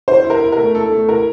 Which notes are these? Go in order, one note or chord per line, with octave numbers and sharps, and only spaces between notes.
E4 C5
E4
A#4
E4
A#4
A3
E4 A4
A3
E4 A#4